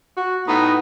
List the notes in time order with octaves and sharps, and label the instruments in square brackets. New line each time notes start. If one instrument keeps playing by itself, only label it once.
[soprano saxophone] F#4
[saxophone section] A2 B3 [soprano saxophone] D#4